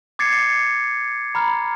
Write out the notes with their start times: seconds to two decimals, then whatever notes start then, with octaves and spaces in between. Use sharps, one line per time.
0.19 D6 G#6 A6 C7 C#7
1.35 A#5 B5 F6